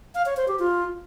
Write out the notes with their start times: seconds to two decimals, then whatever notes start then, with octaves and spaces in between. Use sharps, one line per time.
0.15 F5
0.26 C#5
0.37 C5
0.48 G4
0.59 F4